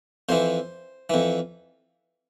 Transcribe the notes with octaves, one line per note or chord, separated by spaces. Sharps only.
F2 E3 C5
F2 E3